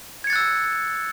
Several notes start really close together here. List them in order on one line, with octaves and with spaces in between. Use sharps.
G#6 C#7 A6 F#6 E6